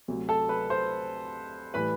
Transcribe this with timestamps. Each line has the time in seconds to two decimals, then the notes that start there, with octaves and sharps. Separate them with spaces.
0.08 D2 C3 F#3
0.29 A4 A5
0.49 B4 B5
0.70 C5 C6
1.74 A2 E3 G3 B4 B5